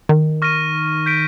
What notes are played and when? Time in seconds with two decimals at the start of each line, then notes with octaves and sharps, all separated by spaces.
0.09 D#3
0.42 C#6 F6 A#6 D#7
1.06 G6 B6 D7